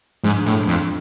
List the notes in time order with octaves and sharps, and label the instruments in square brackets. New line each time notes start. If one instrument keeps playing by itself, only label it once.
[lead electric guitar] G#2 [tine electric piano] F3 G#3 D4
[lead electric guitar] A2
F2